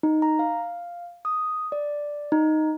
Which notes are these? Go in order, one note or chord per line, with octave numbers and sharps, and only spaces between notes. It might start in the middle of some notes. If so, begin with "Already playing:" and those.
D#4
A#5
F5
D#6
D5
D#4